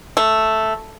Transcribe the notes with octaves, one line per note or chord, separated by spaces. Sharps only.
A3